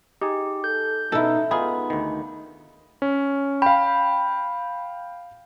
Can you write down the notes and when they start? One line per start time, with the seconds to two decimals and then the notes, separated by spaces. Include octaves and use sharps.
0.22 D#4 G4 G#4
0.64 A4 G6
1.12 B2 D#4 E4 A4
1.51 B3 D#4 F4 G#4 B5
1.90 D2 D#3
3.02 C#4
3.62 F5 G5 B5